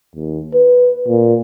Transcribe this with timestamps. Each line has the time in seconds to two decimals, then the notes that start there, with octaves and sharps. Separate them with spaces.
0.16 D#2
0.54 B4
1.08 A#2